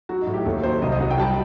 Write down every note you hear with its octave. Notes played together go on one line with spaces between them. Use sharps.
F#3 F#4
D#4
A2
G4
D#2 A4
F#3 C5
C2 D#5
D#5
F#3 F#5
G5
G3 A5